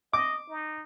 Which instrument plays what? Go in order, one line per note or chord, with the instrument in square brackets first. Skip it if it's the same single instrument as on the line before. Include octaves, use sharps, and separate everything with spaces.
[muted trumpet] D#5 [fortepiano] D6
[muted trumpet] D#4